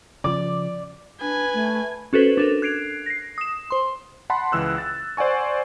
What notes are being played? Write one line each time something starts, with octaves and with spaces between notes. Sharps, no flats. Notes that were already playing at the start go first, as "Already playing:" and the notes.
C#3 F3 D5 D6
D4 B4 G#5
A3
C#4 F#4 A4 B4 C5
D4 A4 A#4
F#6 G#6 C7 D7 F7
A#6 C7
D#6 E7
C5 C6
F#5 A5 B5 C6
C#2 E3 E6 F#6
A6
C5 D5 F#5 G#5 C#6